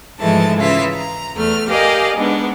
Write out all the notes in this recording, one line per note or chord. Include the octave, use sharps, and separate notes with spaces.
G#2 E3 F3 G#3 A3 A5
C#3 E3 F4 E5
A#5
E2 A3 F6
G4 A#4 D5 D#5 F5 G#5
G#2 B3 D4